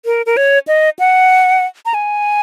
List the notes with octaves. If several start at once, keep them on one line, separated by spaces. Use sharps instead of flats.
A#4
A#4
C#5
D#5
F#5
A#5
G#5